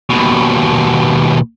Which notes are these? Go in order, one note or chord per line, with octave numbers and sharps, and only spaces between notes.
D#2 B2